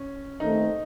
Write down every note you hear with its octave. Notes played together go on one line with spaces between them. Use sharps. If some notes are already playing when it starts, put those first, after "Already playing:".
Already playing: C#4
D#2 D#3 A3 C4 D#4